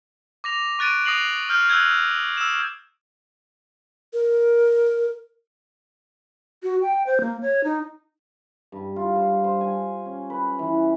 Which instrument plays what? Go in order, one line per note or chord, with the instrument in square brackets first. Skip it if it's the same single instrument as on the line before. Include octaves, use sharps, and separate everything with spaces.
[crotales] D6 A#6 F7
C#6 F#6 A6 D7 D#7
D#6 A#6 C7 F7 F#7
F6 G6
E6 F#6 G#6
E6 E7
[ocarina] A#4
[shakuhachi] F#4
G5
C5
A#3
C#5
D#4
[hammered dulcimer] G2
F4
C5
C5
G#5
C#4
B4
E3